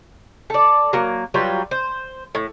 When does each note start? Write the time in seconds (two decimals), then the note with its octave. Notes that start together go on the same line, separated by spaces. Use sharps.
0.50 A4 D5
0.93 F#3 A#3
1.34 F#3 G3 F4 B4
1.71 C5
2.35 A2